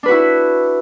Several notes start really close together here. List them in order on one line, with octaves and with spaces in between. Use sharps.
D4 B4 F#4 E4